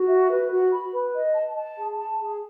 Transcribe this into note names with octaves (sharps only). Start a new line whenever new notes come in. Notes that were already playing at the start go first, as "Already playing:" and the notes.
Already playing: F#4
E5
B4
F#4
B5
B4
D#5
A5
A5
G#4
A5
G#4